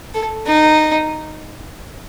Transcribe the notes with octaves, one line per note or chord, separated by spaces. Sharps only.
A4
D#4